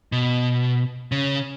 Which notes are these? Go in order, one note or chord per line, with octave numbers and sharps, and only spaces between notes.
B2
C#3